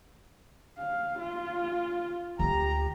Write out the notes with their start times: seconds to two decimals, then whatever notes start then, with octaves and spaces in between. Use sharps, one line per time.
0.77 F5
1.18 F4
2.39 D2 F4 G4 A#5